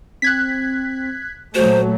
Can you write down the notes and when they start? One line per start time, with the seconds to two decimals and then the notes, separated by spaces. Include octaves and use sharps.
0.22 C4 F#6 G#6 B6
1.55 A#2 F#3 A3 F#4 C5